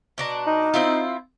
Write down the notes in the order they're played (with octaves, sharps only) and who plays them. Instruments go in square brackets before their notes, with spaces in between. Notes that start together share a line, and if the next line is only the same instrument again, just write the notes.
[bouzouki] B2 D4 A#5
[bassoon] D#4
[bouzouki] C4 E4 F4